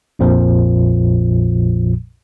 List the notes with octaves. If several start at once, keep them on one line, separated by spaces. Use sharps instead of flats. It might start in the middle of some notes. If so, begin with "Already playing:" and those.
A#1 F2 A#2 F3